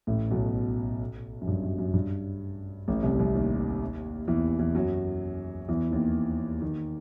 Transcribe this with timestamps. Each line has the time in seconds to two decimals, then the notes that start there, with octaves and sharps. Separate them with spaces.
0.07 A1 A2
0.31 B1 B2
1.41 F#2
1.47 G2
1.63 F#2
1.78 F#2
1.94 G2
2.88 A1 A2
3.03 C2 C3
3.18 C2 C3
3.35 D#2 D#3
4.28 E2 E3
4.59 E2 E3
4.74 F#2 F#3
5.68 E2 E3
5.91 D#2 D#3
6.62 D#2 D#3